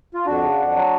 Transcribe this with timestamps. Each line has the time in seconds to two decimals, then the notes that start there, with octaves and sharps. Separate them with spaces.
0.14 F4
0.26 F2 D4 F#4
0.42 C#3
0.59 F2
0.75 F#3